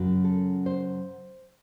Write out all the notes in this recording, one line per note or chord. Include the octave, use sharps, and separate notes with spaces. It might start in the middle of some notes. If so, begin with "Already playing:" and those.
Already playing: F#2 C#3 F#3
A4
C5